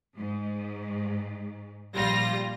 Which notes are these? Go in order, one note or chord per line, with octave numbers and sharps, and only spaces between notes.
G#2
A#1 G3 F4 A#6